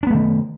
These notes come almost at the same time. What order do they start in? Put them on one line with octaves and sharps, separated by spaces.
D4 B3 A3 D#3